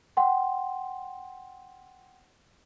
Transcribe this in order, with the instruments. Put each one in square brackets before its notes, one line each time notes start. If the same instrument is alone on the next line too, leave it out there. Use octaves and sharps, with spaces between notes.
[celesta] F#5 G5 C6